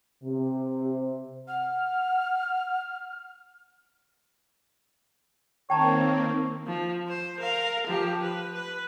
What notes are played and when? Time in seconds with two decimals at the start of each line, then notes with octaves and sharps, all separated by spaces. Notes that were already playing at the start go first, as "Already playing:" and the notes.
0.23 C3
1.48 F#5 F6
5.70 D#3 A#3 C4 C#5 G5 A5 A#5
6.67 F3
7.08 C5
7.40 A#4 F5
7.87 F3 G4
8.22 B4
8.54 B4